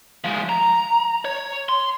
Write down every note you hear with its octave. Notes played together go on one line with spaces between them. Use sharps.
F3 G#3
A#5
C#5
C6